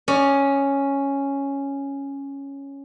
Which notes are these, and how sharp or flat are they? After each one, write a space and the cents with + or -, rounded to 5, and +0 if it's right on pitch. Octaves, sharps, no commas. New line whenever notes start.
C#4 +0 D5 +35